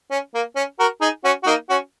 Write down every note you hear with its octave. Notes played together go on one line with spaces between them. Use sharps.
C#4
A#3
C#4
F#4 A#4
D#4 G#4
C#4 F#4
F#4
A#3 D#4
C#4 F#4